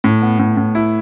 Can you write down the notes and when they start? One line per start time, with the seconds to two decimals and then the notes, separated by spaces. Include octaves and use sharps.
0.04 A2
0.22 B3
0.39 A2
0.57 A2
0.75 E4